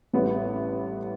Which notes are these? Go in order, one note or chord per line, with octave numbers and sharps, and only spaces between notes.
A1 A2 G3 B3